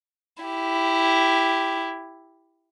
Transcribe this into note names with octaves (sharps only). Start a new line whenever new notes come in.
E4 G4